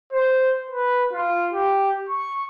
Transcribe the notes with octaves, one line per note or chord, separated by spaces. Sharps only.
C5
B4
F4
G4
C#6